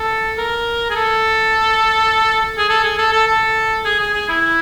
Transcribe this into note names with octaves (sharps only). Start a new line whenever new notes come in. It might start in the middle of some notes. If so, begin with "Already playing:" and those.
Already playing: A4
A#4
G#4
A4
G#4
A4
G#4
A4
A4
A4
G#4
G#4
G#4
E4